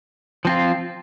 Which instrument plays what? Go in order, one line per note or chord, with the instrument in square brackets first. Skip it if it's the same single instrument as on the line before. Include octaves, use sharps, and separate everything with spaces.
[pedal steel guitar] F3 C4 F4